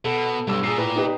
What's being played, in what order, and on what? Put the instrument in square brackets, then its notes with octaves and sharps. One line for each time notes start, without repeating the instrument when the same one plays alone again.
[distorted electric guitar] B2 [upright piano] A4
[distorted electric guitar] B1 [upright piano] G2 E6
[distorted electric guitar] A#2 [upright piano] G#4 E6 C7
[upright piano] A2 B4
D#4 G4 B4